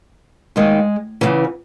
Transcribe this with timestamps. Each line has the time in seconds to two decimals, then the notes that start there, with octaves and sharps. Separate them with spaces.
0.56 D#2 D#3 G#3
1.21 E2 C#3 E3